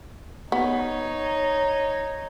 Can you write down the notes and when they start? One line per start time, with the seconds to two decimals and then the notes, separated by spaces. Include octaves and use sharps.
0.52 B3 D#4 C#5